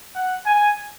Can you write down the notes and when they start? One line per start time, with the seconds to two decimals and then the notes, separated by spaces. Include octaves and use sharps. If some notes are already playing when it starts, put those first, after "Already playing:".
0.15 F#5
0.46 G#5